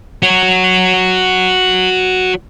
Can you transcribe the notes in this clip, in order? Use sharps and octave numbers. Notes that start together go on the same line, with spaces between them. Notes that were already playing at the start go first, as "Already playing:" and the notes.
F#4 C#5